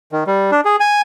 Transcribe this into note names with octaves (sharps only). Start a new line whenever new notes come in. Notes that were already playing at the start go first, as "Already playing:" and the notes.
D#3
G3
D4
G#4
G#5